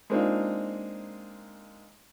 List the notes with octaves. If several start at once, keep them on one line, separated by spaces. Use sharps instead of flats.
G#3 A#3 C4 D4 D#4 F4